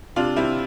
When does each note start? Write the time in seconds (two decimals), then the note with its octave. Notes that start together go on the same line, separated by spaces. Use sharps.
0.16 C3 D4 F4
0.36 C3 C4 E4